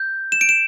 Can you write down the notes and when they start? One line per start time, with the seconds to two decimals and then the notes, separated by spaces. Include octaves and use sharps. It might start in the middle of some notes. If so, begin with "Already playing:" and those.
Already playing: G6
0.32 E7
0.41 D7
0.49 E7